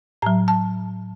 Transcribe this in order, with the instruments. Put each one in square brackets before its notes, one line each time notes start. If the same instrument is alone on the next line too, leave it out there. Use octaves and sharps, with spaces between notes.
[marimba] A2 F#3 A#5
A5